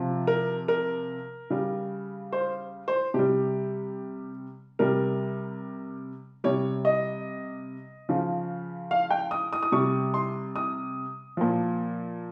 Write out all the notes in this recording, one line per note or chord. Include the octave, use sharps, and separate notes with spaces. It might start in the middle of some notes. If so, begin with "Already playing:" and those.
Already playing: C3 F3
A#4
A#4
C#3 G3
C5
C5
C3 G3 G4
C3 G3 A#4
C3 G3 C#5
D#5
C#3 F3
F5
G5
D#6
D#6
D#6
C3 G3 C#6
C6
D#6
A#2 F3